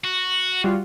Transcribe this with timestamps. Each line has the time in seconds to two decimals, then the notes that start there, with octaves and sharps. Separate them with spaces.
0.04 F#4
0.64 G3 F4 F#4